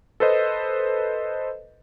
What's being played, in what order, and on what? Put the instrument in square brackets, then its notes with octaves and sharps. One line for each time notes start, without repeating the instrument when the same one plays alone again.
[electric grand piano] A4 B4 C5 D#5